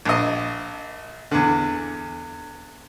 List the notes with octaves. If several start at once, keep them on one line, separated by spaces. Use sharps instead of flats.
A#1 D#5
E2 D3